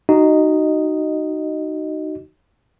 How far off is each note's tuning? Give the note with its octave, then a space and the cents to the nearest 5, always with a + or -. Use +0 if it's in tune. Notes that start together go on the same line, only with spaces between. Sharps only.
D#4 -10 F#4 +25 D#5 +0